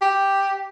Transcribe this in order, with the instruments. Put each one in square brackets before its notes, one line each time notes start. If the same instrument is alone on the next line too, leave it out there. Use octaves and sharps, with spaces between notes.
[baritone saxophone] G4